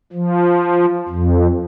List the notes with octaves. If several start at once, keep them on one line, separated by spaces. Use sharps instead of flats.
F3
F2